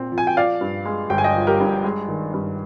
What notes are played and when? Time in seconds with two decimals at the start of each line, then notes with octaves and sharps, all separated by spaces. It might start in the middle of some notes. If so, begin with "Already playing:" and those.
Already playing: A#2 C4
0.12 F3
0.18 G#5
0.27 G5
0.37 F3 D5 F5
0.61 G2
0.85 G#3
1.10 G1 G5
1.18 G#5
1.24 D#5 G5
1.36 F3
1.47 G4 A#4
1.60 G2
1.84 G#3
2.08 D#3
2.34 G2